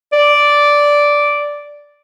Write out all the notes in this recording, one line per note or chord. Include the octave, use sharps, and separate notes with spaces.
D5